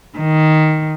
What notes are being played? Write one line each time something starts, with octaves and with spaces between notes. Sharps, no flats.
D#3